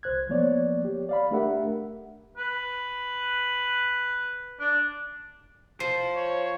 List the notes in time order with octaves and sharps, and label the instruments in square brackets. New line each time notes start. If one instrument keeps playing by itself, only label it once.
[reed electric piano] C2 C5 F#6 G#6
F3 A#3 B3 C#5 D5
G4
D5 F5 B5
A3 D4 G4 A#4 E5 F#5
[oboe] B4
D4
[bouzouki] F3 [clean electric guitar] C5
[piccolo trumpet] C#5